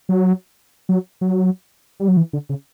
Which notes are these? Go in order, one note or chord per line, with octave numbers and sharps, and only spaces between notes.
F#3
F#3
F#3
G3
F#3
E3
D3
C#3